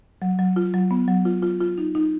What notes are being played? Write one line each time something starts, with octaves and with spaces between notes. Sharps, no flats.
F#3
F#3
F4
F#3
B3
F#3
F4
F4
F4
D#4
D#4